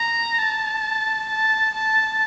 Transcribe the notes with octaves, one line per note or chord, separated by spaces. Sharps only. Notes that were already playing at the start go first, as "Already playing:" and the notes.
Already playing: A#5
A5
A5
A5